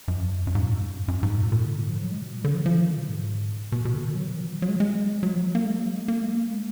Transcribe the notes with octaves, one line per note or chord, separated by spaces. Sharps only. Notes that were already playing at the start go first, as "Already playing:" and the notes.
F#2
F2
F#2
G#2
A#2
F#2
G#2
F#2
F#2
G#2
A#2
A#2
D3
G#2
F3
F#3
G#3
B2
A#2
D3
F3
F3
D#3
D3
B2
G#2
B2
B2
D3
D#3
F#3
F3
D#3
F3
F#3
G#3
G#3
F#3
F3
F#3
A#3
G#3
A#3
F#3
G#3
A#3
G#3
A#3
G#3